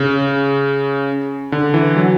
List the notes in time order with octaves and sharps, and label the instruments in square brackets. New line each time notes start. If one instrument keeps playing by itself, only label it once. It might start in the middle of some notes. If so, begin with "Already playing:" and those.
Already playing: [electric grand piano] C#3
D3
E3
F#3